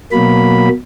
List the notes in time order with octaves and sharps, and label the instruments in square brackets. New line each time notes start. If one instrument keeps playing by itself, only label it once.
[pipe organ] B2 F#3 A#3 B5